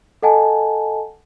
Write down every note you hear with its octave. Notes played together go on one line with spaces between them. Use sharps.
A4 D#5 F#5 G#5 A5